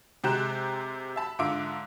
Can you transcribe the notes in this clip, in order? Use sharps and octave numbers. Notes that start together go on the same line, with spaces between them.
C3 G#3 G4 A#5 F#6 E7
E5 A5 B5
G#2 D3 F4 E5 D6 D7